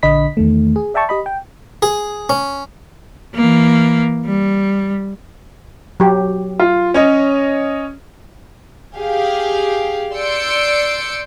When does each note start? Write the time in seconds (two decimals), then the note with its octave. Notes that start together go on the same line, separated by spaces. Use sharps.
0.03 A#1 D3 D#5 B5 B6
0.37 E2 D#3 A3
0.76 G#4
0.94 D5 E5 G5 A5 C#6
1.09 G4 D#5 B5
1.26 G5
1.82 G#4
2.30 C#4
3.35 E3 A#3
4.27 G3
6.00 F#3 G4
6.59 F4
6.94 C#4 C#5 D#5
8.96 G4 G#4 F5
10.13 D5 C6 E6 G6 C#7 D7